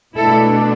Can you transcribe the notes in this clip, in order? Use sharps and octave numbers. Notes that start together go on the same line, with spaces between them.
B2 A3 D4 E4 A4